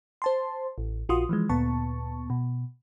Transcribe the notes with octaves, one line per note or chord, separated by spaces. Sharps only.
C5 A5 C6
A1
A#1 F4 F#4 C6 D#6
E3 F3 G#3
D2 A#2 B3 A5 C#6
B2